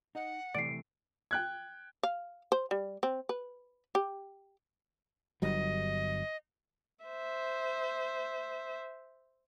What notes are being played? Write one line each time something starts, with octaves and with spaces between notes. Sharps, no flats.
D#4 D#5 F#5
C3 E3 A3 D5 C7 D7
G5 F#6 G#6
F5
C5
G3
C4
B4
G4
G1 G2 F#3 D#5
C5 E5